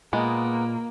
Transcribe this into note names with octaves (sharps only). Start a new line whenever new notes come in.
A#2 G#3 A#3 B3